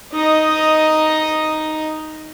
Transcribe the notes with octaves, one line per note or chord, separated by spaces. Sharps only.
D#4 D#5